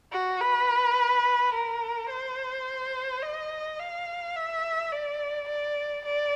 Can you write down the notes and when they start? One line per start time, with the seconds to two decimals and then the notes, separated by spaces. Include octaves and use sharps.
0.12 F#4
0.41 B4
1.54 A#4
2.10 C5
3.22 D#5
3.79 F5
4.36 E5
4.92 D5
5.49 D5
6.06 D5